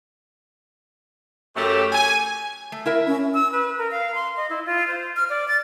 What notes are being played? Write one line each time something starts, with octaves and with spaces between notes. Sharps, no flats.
F#2 A3 G4
G#5
A3
E4 A#4 E5
C#4
E6
B4
A#4
F5
C6
D#5
E4
F4
C5
F6
D5
A6